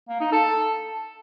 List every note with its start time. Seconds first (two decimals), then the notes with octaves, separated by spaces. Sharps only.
0.09 A#3
0.21 D#4
0.32 A4